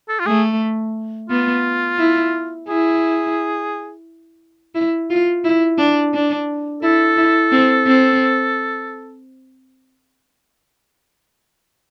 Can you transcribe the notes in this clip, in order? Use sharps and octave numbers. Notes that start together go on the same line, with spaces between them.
A4
F4
A3 G#4
B3 F4
E4
E4 G#4
E4
F4
E4
D4
D4
E4 A4
E4
C4
C4